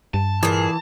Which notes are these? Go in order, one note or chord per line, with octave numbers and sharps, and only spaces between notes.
G2 A5
A#2 E3 G#4